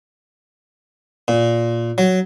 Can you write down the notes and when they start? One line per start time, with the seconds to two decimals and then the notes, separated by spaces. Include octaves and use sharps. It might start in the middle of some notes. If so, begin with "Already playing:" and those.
1.28 A#2
1.98 F#3